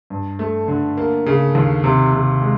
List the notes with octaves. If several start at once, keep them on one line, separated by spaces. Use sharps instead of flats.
G2
A3
D3
A#3
C#3
D#2
C3
C3
G#3